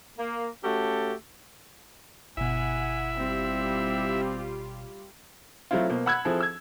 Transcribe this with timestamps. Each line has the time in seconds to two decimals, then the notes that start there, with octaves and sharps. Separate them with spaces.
0.18 A#3
0.63 A3 C#4 F#4 G4 A4
2.37 G1 B2 E4 E5 F#5 G#5
3.17 G3 C4 F4 G4
5.71 F#3 A3 C4 E4 F4
5.89 B2 A#3 C5
6.06 F#5 B5 E6 F#6 G#6
6.25 F3 C4 E4 G#4 A4
6.40 E6 G#6